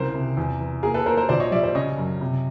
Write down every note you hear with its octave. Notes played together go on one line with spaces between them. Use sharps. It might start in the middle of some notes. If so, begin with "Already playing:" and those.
Already playing: C2 C#3 A#4 C5
C3
E2
E3
A#3 G#4 A#4
A4 B4
A#3 A#4 C5
A#4 C5
A#1 C5 D5
C#5 D#5
G3 D5 E5
C5 D5
C#3 C#5 D#5
F#2
C3